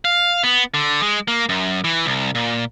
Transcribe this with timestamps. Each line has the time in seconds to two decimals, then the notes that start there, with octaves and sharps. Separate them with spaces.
0.05 F5
0.44 B3
0.74 D3
1.03 G#3
1.28 A#3
1.49 F#2
1.84 E3
2.06 C2
2.35 A#2